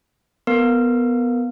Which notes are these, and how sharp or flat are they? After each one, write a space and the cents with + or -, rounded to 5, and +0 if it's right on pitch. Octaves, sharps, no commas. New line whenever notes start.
B3 +0 A#4 -20